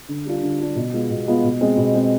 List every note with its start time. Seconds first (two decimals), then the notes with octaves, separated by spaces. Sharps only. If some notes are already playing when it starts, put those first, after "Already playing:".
0.08 D3
0.25 G3 D4 F4
0.42 D3
0.60 G3 D4 F4
0.75 B2
0.93 G#3 B3 F4
1.10 B2
1.27 G#3 B3 F4
1.44 B2
1.61 G#3 C4
1.77 B2
1.94 G#3 C4